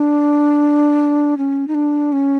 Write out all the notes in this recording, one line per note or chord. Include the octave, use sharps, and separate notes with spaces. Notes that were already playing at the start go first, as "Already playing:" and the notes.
Already playing: D4
C#4
D#4
D4
C#4